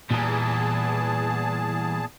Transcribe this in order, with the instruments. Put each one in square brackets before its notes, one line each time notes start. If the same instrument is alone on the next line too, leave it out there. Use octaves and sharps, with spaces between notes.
[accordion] E2 G#4 A5 [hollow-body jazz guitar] A#2 A#5 [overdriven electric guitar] E3 G3